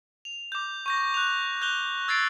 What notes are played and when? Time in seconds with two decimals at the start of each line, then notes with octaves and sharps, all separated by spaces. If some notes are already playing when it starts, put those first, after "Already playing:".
0.25 F7
0.52 D6 G6
0.86 C#6 G6 A#6
1.14 F#6 F7
1.62 F#6 G6 F7 G7
2.08 E6 G#6 A6 C7 D7